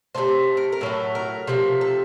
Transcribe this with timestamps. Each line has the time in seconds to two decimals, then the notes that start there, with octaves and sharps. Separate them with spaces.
0.15 C3 F3 A3 C5
0.57 A#4
0.73 A#4
0.81 A2 F#3 A3
1.15 A#4
1.47 C3 F3 A3
1.81 A4